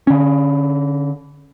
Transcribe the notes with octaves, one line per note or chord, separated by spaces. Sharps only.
D3 C#4